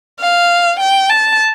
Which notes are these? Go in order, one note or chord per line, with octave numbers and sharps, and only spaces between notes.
F5
G5
A5